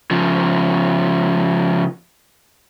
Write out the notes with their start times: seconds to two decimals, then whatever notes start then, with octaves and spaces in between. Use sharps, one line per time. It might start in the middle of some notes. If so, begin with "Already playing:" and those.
0.11 C#3 F3